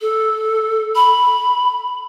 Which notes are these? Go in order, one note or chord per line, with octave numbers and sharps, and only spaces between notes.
A4
B5